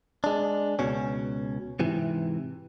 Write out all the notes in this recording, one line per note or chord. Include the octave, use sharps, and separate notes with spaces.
G#3 D4
C#2 B2 C#4
G#2 C3 E3